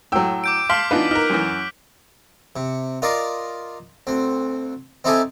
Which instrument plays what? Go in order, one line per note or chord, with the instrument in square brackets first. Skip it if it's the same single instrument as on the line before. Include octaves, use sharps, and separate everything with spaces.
[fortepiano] A2 F#3 [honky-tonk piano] G5 E6
[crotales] D6 G6 D7
[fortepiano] F5 A5 [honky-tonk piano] C6 [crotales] F6 B6 F#7
[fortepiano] E3 B3 F4 [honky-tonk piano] D4 D#4 B4
[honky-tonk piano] D#4 A#4 [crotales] F6 F#6
[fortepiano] F#2 E3
[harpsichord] C3
F4 A#4 D5 D#5 F5
D2 C4
C4 D#4 E4 G4 A4 G#5